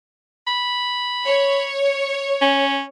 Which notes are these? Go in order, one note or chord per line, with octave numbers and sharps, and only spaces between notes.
B5
C#5
C#4